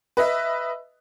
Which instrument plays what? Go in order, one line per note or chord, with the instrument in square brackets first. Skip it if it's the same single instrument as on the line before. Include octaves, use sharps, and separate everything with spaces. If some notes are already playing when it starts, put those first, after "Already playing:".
[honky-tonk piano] B4 D#5 E5